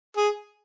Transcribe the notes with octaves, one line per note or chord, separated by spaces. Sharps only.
G#4